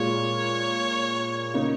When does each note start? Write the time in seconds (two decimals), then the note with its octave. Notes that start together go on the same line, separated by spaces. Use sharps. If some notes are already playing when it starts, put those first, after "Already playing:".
Already playing: A#2 G#3 F4 C#5
1.54 C#3 A#3 D#4